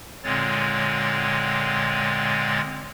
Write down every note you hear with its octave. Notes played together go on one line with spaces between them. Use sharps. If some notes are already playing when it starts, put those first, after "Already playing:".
A#2 D3 G#3 C4 C#5 A6